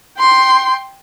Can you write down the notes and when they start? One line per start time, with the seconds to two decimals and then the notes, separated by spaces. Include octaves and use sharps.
0.18 G5 C6